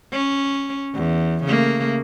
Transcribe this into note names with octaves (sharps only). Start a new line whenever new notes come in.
C#4
E2
C#3 A3 A#3